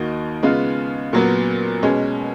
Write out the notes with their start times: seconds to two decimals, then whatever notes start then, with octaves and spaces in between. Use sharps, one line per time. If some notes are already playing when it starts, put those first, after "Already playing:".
Already playing: D#2 D#3 A#3 D#4 F#4
0.43 C#3 G#3 B3 F4
1.13 A#2 F#3 B3
1.83 B2 G#3 C#4